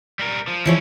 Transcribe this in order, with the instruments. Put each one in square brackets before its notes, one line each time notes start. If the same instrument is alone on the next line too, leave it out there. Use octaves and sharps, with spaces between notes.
[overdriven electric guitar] G3 A#4
F3
[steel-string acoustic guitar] E3 F3 C#5 [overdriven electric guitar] C#4 E4